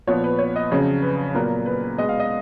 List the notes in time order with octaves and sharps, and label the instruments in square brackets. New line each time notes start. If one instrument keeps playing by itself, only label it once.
[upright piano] A#2 F3 B3 C#5
B4
C#5
D#5
F2 C#3 F#3 C#5
B4
A#2 F#3 B3 A#4
B4
B2 G#3 B3 D#5
F5
D#5